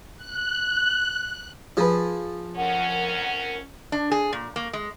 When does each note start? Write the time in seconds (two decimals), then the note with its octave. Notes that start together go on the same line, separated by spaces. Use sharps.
0.17 F#6
1.77 F3 G#4 B4
2.57 F2 C#4 A#4 F#5
3.92 D4
4.11 G#4
4.33 A#2
4.56 A#3
4.73 G#3